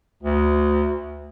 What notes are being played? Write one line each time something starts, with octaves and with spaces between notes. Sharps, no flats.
D2